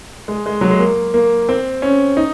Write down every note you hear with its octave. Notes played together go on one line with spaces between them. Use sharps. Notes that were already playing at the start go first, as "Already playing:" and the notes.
G#3
G#3
F#3
G#3
A#3
A#3
C4
C#4
D#4